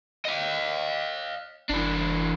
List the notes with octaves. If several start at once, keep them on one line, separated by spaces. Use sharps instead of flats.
D#5 F5
F#1 E3 D4